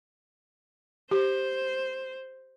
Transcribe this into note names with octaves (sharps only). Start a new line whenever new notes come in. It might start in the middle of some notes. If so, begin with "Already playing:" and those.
G4 C5